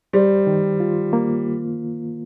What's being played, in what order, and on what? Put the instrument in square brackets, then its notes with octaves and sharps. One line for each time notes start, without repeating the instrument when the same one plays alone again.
[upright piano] G3 [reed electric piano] C5
[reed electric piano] D#3
F4
A#3